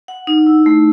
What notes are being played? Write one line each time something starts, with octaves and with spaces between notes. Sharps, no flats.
F#5
D#4
E4
A3